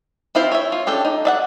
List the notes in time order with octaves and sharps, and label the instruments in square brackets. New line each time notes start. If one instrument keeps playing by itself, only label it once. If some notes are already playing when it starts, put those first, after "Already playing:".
[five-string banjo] C4 E4 F4 C5
C#5 E5
F4
C#4 D4 G4 A4
D#4
D5 E5 F#5